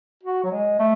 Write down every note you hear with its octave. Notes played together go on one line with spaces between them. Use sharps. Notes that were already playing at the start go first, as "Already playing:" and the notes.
F#4
F#3
G#3
A3